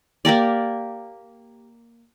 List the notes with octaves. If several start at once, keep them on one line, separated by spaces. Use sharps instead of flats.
A#3 G4 A#4 D5